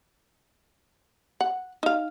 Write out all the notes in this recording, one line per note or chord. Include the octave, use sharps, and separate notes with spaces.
F#5
D#4 F5